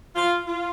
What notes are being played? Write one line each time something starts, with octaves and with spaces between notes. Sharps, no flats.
F4
F4